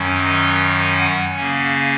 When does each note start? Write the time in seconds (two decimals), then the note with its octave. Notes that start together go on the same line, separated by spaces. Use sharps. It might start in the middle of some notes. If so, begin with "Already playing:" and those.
Already playing: F#2 D#3 F#3 C#4
0.23 D#5
0.99 F#5
1.37 C#3 A#3 C#4 G#5